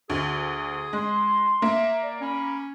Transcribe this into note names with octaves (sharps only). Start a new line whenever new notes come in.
D2 G#4
G#3 C6
A#3 E5
D5
C#4 B5